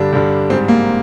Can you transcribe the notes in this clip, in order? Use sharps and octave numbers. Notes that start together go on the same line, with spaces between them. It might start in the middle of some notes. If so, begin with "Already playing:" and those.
Already playing: G2 D3 G3 D4
G2 D3 G3
G#2 G3 C4
A#3